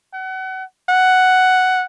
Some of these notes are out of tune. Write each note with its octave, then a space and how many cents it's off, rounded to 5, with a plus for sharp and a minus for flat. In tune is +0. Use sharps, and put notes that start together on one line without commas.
F#5 +30
F#5 +5